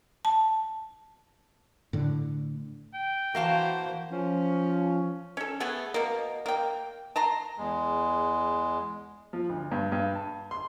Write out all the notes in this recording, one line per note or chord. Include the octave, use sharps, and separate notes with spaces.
A5
A2 D3
G5
E3 A#3 F#4 C5 F5 A5
F3 C#4
C#4 A4
A3 B3 G#4 B4
B2 A#3
A#3 G5
A5 A#5 C6
E2 G#3
F3
D2
G2
G2
A5
C6